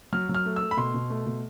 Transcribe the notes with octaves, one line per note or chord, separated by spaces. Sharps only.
F#3 F6
F#3
F6
A3
A3 E6
B5
B2 C6
B2
A3
B2